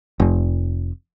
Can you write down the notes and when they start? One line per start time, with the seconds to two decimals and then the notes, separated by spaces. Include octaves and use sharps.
0.20 F1